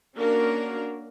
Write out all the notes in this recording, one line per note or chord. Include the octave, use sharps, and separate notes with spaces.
A#3 C#4 D4 F#4 A#4